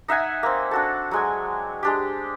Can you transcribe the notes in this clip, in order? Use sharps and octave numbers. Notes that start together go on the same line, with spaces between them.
D#4 E5 F#5 G#5
A#3 C4
D4 F#4 A4
F#3 G#3 G#5
G#3 D4 G4